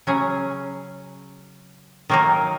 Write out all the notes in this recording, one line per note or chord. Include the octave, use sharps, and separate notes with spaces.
C#3 F#3 C#4 G#4
D#3 F#3 A#3 D#4